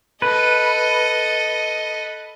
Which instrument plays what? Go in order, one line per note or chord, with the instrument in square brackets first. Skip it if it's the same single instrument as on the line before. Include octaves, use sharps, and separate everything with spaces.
[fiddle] A4 D#5 [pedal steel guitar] B4